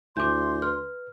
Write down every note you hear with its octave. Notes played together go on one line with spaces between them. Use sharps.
D2 E4 G#5 C6 D6 G6
B4 F6